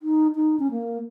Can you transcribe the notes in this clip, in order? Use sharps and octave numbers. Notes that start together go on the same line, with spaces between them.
D#4
D#4
C#4
A#3